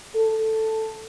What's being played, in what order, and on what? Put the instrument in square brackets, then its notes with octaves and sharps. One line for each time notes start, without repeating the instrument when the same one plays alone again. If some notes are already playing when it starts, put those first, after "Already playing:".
[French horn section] A4